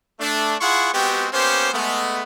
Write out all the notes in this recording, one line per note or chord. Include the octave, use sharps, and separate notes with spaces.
A3 D4
E4 F4 G#4 F#5 C6 C#6
G#3 B3 C4 F#4 G4
A#3 B3 C#4 G4 C5
G#3 A3 B3